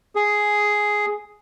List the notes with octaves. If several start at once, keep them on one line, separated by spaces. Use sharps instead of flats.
G#4